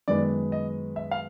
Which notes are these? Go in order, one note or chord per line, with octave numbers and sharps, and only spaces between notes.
F#2 D#3 G#3 B3 D5
D#5
E5
F5